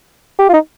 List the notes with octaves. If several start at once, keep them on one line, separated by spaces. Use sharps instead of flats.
G4
F4
D#4